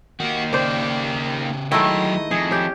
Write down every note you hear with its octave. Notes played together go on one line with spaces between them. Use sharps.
D#3 A#3 F#4
C#3 G4 C5 D5
D#3 F#3 G#3 A3 E4 A4 D#5 G5
F2 G#4
C#4 G4